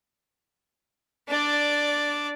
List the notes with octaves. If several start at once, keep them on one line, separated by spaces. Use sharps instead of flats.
D4 D5